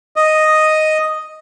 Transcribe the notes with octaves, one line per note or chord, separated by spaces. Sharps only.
D#5